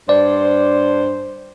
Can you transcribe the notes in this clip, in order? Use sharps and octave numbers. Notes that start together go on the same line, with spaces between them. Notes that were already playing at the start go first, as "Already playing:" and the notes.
G2 D4 C5 D5